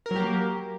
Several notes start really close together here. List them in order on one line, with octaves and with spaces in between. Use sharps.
A#4 F#3 G4 A#3